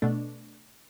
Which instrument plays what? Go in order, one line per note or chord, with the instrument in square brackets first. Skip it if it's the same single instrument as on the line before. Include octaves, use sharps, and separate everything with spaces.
[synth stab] B2 A3 D4